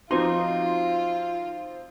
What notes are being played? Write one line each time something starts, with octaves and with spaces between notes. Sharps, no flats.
F3 C4 D#4 F4 F#4 C6 D6